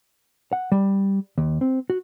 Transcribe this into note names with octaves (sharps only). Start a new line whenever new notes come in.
F#5
G3
D#2
C4
F#4